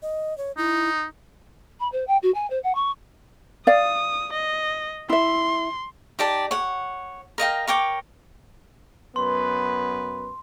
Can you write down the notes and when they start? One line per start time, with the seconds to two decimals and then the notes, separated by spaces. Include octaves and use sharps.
0.02 D#5
0.38 C#5
0.58 D#4 E4
1.80 B5
1.92 C5
2.07 G5
2.23 F#4
2.35 G#5
2.50 C5
2.64 F#5
2.75 C#6
3.67 D5 F5 D#6
4.33 D#5
5.09 E4 E5 C6
6.19 D#4 G4 D5 A5
6.51 C#5 F#5
7.38 A#4 D#5 F5 G5
7.67 A#4 C#5 G5 D6
9.16 F#2 B3 B4 C6